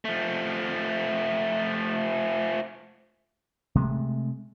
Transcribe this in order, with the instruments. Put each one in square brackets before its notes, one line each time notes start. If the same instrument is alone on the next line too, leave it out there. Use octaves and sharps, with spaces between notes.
[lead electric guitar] F3 A3
[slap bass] C3 G#3 A3